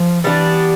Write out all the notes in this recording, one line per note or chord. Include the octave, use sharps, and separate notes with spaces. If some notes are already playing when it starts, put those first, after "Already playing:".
Already playing: F3
E3 G3 B3 D4